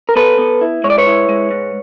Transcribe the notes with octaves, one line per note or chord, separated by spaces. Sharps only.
A#4
B3 A4 B4
B3
E4
G#3 C#5
D5
B4 C#5
E4
G#3
G#2